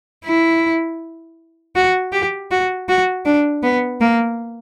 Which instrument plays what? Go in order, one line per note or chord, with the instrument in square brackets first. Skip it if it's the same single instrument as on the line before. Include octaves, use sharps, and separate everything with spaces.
[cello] E4
F#4
G4
F#4
F#4
D4
B3
A#3